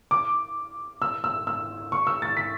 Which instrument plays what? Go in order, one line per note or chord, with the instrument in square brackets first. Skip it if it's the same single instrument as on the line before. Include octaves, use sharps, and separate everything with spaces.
[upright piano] D6
E6
E6
E6
C#6
E6
A6
B6